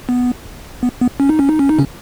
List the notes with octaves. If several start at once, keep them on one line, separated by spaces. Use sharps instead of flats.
B3
B3
B3
C#4
D#4
C#4
D#4
C#4
D#4
C#3 C#4